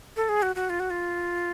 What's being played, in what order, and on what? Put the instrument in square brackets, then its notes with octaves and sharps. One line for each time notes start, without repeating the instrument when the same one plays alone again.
[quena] A4
G#4
F#4
F#4
F4
F#4
F4